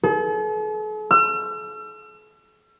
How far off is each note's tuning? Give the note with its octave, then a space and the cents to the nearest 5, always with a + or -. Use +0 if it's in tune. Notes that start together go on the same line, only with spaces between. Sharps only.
A4 -45
E6 +45